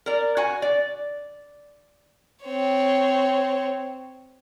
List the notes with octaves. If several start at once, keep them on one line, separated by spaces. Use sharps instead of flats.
A#4 D5
F#4 G#5
D5
C4 C#5